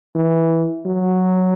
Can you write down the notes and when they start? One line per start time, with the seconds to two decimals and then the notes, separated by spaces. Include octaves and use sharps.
0.15 E3
0.86 F#3